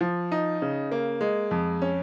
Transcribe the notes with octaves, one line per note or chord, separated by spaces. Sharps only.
F3
D#4
C#3
A#3
G#3
F2
C#4